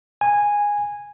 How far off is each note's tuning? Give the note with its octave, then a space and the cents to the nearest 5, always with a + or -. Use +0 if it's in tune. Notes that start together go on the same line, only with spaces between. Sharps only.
G#5 -10